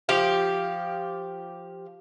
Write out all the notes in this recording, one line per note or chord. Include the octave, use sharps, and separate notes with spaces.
F3 G4 F5